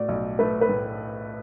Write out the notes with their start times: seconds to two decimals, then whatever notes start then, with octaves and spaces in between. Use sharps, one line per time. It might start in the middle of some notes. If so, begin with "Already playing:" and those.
Already playing: A2 F#4 D5
0.08 B1
0.39 A3 B4
0.61 B4
0.69 A2